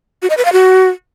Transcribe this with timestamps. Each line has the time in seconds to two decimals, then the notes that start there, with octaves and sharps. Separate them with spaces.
0.22 F#4
0.30 D#5
0.37 B4
0.45 F5
0.53 F#4